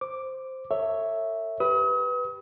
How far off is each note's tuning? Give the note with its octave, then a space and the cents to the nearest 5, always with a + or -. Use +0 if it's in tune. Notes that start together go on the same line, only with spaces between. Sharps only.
C5 +0 D6 +0
A4 +45 C#5 +0 E5 -5
G4 +0 B4 +0 D#6 +40